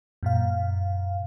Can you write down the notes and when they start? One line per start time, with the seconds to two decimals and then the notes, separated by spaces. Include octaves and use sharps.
0.23 F#2 A#2 F5